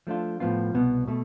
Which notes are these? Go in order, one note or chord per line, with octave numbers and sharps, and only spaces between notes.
F3 A3 D4 F4
A2 F3 B3 F4
C2 B2 B3
B2 A3